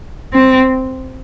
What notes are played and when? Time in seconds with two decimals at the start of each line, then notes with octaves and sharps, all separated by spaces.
0.33 C4